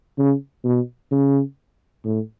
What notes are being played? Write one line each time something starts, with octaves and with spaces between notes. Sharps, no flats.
C#3
B2
C#3
A2